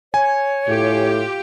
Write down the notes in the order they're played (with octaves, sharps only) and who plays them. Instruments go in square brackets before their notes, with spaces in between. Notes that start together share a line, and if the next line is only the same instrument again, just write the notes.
[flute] C#5 [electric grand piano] G#5
[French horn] A2 [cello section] F4 G4